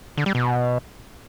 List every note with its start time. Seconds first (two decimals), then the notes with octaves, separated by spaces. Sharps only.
0.18 D3
0.26 G3
0.35 B2